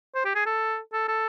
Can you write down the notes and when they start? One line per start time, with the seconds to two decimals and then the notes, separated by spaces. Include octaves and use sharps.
0.15 C5
0.25 G4
0.35 G#4
0.46 A4
0.93 A4
1.08 A4